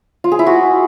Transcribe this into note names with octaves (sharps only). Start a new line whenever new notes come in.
F4
G#4
E4
F#4